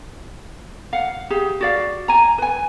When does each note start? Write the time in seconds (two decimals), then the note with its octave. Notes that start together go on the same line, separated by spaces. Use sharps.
0.93 F5 F#5
1.30 G4 G#4
1.61 F#4 D5 F5
2.08 G#5 A#5
2.38 B4 G#5